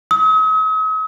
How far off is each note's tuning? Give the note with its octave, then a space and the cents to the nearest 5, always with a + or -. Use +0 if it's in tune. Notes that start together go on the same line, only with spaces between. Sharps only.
D#6 +45